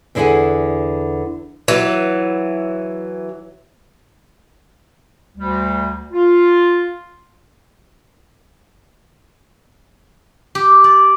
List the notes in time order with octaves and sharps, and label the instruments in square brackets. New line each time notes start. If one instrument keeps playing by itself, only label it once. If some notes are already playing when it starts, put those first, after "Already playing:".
[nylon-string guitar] E2 D3 E4 G#4 F#5 G#5
[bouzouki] E3 F#3
[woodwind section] D2 G3
F4
[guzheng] G4
D5